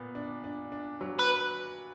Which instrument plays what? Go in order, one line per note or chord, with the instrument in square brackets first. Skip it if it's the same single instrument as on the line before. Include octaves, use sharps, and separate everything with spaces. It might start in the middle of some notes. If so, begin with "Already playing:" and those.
Already playing: [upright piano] A#2 B3
D4
D4
D4
F#3
[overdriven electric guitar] B4